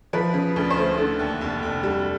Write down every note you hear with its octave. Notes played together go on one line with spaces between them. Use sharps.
F3 B4
C#3
D2
C5
A3
D3 A4
D#2
F1
F1
G3